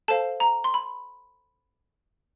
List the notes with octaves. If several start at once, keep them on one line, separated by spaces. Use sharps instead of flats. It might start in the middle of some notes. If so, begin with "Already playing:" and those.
A4 C5 F5 A5
A#5
C6
B5